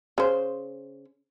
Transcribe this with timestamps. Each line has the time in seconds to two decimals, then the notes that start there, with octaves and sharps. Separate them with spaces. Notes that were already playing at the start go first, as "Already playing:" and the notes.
0.18 C#3 C5